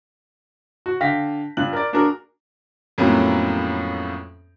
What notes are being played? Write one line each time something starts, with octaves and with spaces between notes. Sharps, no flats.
F#4
D3 F5 G5 A#6 B6
G2 F4 F#6 F#7
A#4 D5
A#3 D4 F#4 G#4 A#4
F2 A2 F#3 A#3 B3 C#4